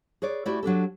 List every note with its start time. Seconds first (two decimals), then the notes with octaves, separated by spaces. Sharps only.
0.22 G#4 B4 C#5 D5
0.46 A3 E4 F#4 G4 D5 E5
0.63 F#3 D4 G4 A4